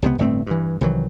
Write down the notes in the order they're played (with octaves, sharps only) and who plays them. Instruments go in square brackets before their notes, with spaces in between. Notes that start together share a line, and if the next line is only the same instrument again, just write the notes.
[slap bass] C#2 C3 F3 B3
G1 A2 A3 C4
G2 E3
C2 D#3 E3 F#3